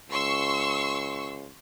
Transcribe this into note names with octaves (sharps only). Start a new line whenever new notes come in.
C#2 C6 C#6 E6